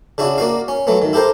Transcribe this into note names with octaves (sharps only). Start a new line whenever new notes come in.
C#3 D4 E4 F#4
A#3 F#4 D5 F5
C#4
F#3 A3 B3
D#3
E4 G4 A4 A#4 C5